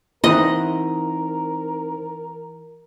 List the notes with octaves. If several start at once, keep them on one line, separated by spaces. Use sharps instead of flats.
E3 C4 D#4 A#4 C5 D#5 F#5